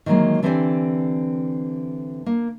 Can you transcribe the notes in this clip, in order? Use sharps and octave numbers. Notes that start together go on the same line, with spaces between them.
D#3 E3 F#3 G#3 A#3
D3 E3 C4 G4 D5 G#5
A#3